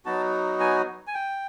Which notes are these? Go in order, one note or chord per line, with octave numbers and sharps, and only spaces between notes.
F#3 B3 D#4 F#4 A5
G#5
G#5
G5